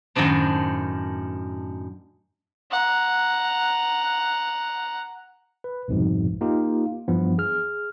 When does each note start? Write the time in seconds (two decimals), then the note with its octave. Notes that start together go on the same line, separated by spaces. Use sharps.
0.15 F#2 A2 D#3 D4 C5
2.71 F#5 A#5
5.64 B4
5.88 C2 F2 G#2 B2 F3
6.41 A#3 D#4 F4 G4
7.08 G2 E3 F3 B3
7.38 G#4 F6